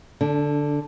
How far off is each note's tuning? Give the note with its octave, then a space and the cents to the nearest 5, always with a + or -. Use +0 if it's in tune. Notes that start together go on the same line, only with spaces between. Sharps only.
D3 +0 D4 -35